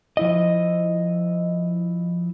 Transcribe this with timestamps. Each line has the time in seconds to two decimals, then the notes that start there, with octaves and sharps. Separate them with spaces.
0.17 F3 E4 D#5